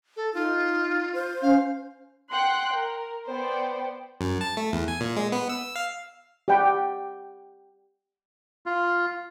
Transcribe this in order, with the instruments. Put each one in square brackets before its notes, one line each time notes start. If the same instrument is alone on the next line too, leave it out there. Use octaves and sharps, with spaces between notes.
[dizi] A4
[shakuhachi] D#4 [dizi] F4
[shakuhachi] C5
[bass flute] C#4 [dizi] F5
[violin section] F#5 G5 C6 F#6
A#4
B3 C5 D5 G5
[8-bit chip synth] F#2
A5
A3
E2
G#5
A#2
G#3
B3
E6
F5
[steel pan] G4 D5 F#5 G5 B5
[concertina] F4